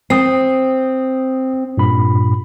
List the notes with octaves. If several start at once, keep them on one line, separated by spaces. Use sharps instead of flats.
C4 D#6 C7
G2 A#2 B5